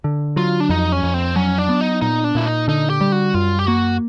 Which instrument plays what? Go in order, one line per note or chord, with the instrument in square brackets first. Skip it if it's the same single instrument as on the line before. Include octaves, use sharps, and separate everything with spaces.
[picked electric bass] D3
[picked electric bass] F#3 [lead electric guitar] F4
[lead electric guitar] D4
[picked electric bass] F2 [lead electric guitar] D#4
[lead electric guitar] C#4
[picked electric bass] F2
[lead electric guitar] C4
[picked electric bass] F#3 [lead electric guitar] C#4
[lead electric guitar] D4
[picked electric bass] B3
[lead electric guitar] D#4
[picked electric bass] A#2 [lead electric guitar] D#4
[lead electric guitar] D4
[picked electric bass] A#2 [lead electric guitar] E4
[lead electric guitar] D#4
[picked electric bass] D3 [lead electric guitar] D#4
[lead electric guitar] G4
[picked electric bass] G3
[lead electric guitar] F#4
[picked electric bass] F#2 [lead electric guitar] F4
[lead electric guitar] G4
[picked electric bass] A#3 [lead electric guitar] F#4